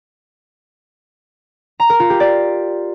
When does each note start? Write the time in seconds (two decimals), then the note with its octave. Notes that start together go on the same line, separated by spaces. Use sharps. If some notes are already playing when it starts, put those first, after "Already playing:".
1.80 A#5
1.90 A#4
2.00 F4
2.10 G4
2.20 D5